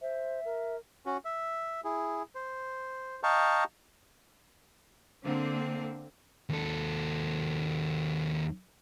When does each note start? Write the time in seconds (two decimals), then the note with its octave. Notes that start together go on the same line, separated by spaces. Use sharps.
0.01 C5 E5
0.45 A#4
1.06 C#4 F#4
1.25 E5
1.84 E4 G#4
2.35 C5
3.23 D#5 F5 G5 A5 A#5 C#6
5.23 D3 A#3 C4
6.49 D#2 A4